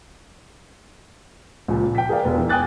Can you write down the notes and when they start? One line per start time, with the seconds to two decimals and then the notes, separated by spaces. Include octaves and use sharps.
1.68 C#2 A#2 F3
1.95 G5 B6
2.09 G#4 A#4 D5 F5
2.23 E1 B4
2.38 E3
2.49 G5 G#5 D#6 F#6 A6